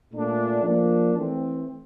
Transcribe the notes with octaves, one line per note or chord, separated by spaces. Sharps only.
A#2 A3 D4
F3 A#3 D4
E3 A3 C4